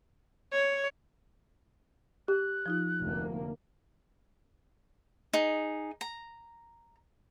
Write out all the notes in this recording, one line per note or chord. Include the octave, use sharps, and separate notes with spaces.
C#5
G4 F#6
F3 D#4 F4
F1 D2 A#3
D#4 G#4
A#5